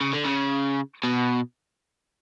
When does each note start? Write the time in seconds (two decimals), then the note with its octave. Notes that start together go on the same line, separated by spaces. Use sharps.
0.01 C#3
0.13 D3
0.25 C#3
1.04 B2